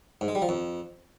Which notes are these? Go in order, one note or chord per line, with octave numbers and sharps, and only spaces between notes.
G#2
G#3
G3
F3
F2